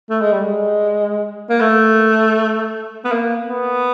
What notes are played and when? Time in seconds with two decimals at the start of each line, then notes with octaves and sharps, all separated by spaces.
0.10 A3
0.21 G#3
0.33 G3
0.44 G#3
1.50 A#3
1.61 A3
3.05 B3
3.12 A#3
3.50 B3